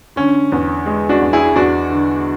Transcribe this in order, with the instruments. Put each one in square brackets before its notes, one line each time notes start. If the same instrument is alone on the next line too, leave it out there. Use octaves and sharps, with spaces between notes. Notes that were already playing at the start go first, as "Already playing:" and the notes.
[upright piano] D3 [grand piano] C#4
[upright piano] E2
G#3
[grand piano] D4 F#4
[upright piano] E2
[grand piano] E4 G#4
[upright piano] E2 [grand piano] D4 F#4
[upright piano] D3